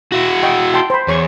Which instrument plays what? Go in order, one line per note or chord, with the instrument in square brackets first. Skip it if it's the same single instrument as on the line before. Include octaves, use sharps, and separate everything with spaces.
[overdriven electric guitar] E4 F#4
[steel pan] D#5 G5 C#6
G5 A5 C6
C5 B5
[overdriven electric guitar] E2 [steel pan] C#5 C#6